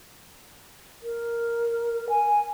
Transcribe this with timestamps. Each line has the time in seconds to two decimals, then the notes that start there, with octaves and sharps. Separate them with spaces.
1.03 A#4
2.09 G#5